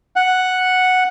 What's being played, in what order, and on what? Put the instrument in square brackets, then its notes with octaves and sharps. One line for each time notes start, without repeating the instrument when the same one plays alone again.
[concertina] F#5